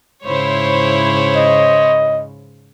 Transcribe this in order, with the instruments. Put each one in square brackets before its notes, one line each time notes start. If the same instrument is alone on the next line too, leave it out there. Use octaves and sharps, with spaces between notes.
[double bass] G#2 C#3 [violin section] E4 C5 C#5
[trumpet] D#5